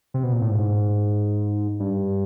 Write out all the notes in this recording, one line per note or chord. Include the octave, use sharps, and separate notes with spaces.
C3
B2
A#2
A2
G#2
G2